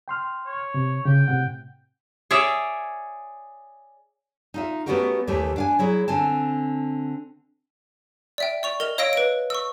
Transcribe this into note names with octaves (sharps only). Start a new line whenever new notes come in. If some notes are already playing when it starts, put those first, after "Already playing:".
G5 C6 F6
C#5
C3
C#3 G5
A2 C3 F#5
G#4 C#5 D5 E5
D#4 F4 E5
A3 B3 C#4 F#4 G4 A#4
D#2 E3 A3 G4
D4 F5 G#5
F#3 E4 G#4
D3 C4 G#5 A5
D5 E5 G5
D5 C#6 F7
A#4 D#5 F7
C#5 D#5 F5 E6 A#6 D7
B4 D7
C#6 E6